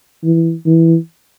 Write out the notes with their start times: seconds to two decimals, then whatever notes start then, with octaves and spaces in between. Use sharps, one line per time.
0.24 E3
0.66 E3